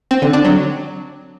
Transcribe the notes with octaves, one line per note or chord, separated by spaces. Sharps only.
C4
D3
D4
F#3